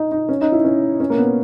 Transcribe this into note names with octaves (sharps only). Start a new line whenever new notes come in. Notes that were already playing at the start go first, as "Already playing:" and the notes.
Already playing: D#4
D#4
C#4
D#4
E4
C#4
C#4
A#3
B3